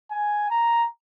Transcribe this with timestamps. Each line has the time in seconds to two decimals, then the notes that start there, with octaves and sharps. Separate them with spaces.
0.11 G#5
0.50 A#5